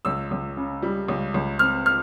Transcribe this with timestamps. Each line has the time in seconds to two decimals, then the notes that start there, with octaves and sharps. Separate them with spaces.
0.05 C#2 E6
0.31 C#2
0.57 C#3
0.82 G3
1.08 C#2
1.34 C#2
1.59 C4 F6
1.86 F6